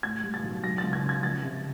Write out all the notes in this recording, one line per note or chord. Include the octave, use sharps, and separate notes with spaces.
A2 G#6
G3
A6
B1
F#3 A#6
A6
C#2
G#6
C#3
G#6
F3 A6
C3